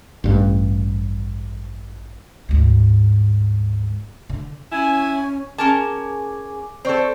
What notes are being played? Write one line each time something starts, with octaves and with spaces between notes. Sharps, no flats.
A1 G2
D2 G#2
D3
C#4 E4 G#5
C#4 G#4 A#4 G#5 A5 D6
C4 A4 C5 D5 C#6